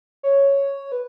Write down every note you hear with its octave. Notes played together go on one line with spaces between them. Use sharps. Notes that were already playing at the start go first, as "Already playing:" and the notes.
C#5
B4